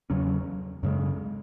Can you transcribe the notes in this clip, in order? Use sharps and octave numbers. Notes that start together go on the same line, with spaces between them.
E2 C#3 F#3 C#4
F#2 C#3 G#3